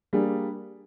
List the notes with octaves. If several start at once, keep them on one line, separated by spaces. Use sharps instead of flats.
G3 A#3 D4 G#4